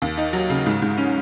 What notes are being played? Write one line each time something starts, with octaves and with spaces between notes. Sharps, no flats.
D#2
D#4
F#3
C#3
G#2
G#2
C#4